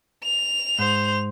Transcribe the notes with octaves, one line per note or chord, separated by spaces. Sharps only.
F7
G#2 C5